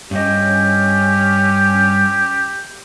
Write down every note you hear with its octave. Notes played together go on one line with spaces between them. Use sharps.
G2 C#4 G4 D#5